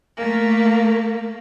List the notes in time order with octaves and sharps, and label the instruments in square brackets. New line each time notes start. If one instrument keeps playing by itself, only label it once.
[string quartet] A3 A#3